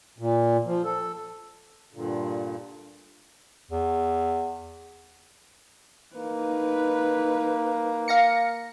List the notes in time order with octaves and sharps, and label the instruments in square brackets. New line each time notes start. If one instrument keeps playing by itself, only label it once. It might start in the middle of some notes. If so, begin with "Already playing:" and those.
[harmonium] A#2
F3
A4
G2 A#2 D3
[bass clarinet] E2
[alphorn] A#3 [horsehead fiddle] D#4 B4
[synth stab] F5 A#6 C#7